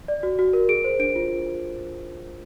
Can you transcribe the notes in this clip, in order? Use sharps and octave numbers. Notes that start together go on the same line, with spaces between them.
D5
F#4
F#4
A#4
G#4 D7
C5
D4 D7
F4